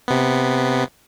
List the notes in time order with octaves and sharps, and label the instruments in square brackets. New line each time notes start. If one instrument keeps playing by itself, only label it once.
[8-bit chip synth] C3 B3